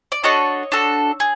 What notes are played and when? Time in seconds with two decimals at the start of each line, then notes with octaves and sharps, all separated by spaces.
0.12 D5
0.23 D4 F#4 A4 C#5 D#5
0.72 D4 F#4 A4
1.20 G#4